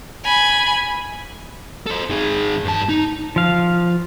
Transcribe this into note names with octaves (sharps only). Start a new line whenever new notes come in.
G#5 B5
A4 C5
D#3 G#4
G2 A5
D#4
F3 F5